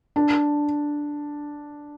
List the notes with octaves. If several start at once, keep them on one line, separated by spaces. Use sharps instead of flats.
D4